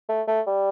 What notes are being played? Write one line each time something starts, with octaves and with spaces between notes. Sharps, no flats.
A3
A3
G3